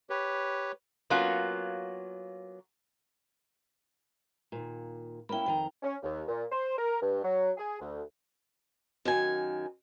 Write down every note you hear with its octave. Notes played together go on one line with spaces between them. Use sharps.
G4 B4 C#5
F#3 A#3 B3 C#4 F4 F#4
D#2 A#2
A#3 C#4 E4 G5 B5
F2 D#3 G5 A#5
C#4
D#2
A#2
C5
A#4
G2
F#3
G#4
D2
F#2 D#3 G#5